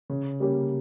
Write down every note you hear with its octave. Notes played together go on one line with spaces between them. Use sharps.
C#3
G3 A#3 C#4 G4